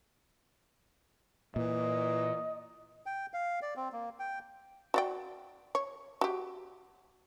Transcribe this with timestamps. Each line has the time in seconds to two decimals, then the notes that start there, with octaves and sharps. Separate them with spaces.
1.56 A#2 E3 D#5
3.06 G5
3.34 F5
3.62 D5
3.76 C4
3.92 A#3
4.19 G5
4.94 F#4 D5 G5
5.75 C#5
6.21 F#4 G4